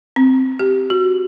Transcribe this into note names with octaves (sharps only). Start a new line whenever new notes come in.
C4
G4
F#4